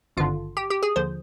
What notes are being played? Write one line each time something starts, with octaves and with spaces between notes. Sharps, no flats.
G#1 G2 D3 F4
G4
G4
G#4
D#2 D3 F3 C5